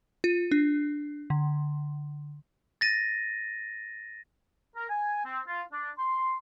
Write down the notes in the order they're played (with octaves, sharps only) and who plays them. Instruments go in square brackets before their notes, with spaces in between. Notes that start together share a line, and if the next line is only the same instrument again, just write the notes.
[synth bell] F4
D4
D3
[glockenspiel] A6 A#6 D#7
[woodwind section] A#4
G#5
C4
F4
D4
C6